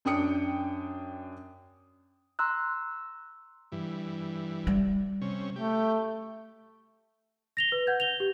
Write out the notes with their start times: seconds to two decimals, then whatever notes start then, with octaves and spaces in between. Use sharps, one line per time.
0.05 F#2 D4 G5 D#6 C#7
2.39 A#5 C6 E6 F#6
3.72 G2 E3
4.67 G3
5.21 C3 C#4
5.56 A3 G4
7.57 A#6 F7 G7
7.72 B4
7.87 F#5 G6 G#6
8.00 F7 G7
8.20 G4